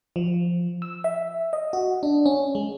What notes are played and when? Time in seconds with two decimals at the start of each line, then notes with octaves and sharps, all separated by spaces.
0.16 F3
0.82 E6
1.04 E5
1.53 D#5
1.73 F#4
2.03 D4
2.26 C#4
2.55 G#3